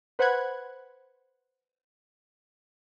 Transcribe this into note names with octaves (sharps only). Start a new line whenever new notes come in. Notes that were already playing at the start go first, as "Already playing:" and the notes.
B4 C5 F#5 B5 F#6 G#6